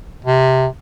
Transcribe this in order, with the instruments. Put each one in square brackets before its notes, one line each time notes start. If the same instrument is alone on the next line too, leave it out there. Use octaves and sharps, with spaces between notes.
[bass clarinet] C3